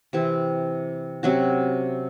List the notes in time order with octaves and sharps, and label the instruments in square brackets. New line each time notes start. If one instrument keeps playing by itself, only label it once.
[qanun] C3 E3 C4
C3 F#3 C#4 F#4